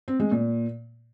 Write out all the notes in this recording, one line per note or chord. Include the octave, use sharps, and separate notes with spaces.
C4
G#3
A#2